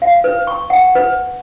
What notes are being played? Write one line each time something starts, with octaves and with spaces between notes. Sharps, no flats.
F5
B4
C#6
F#5
B4